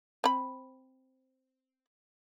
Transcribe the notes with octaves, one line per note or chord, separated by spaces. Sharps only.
C4 B5